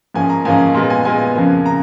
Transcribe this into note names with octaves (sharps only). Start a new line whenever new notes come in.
G#2 F3 A#3 C#4 G#5
A#5
G#2 F3 A#3 C#4 G#5
A#2 G#3 B3
G#5
A#2 G#3 B3 G#5
F2 C#3 F3 A#3
C#3 A#5